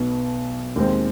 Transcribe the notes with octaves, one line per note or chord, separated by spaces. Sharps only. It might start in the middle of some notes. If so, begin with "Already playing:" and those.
Already playing: B1 B2 B3
D#2 D#3 G#3 C4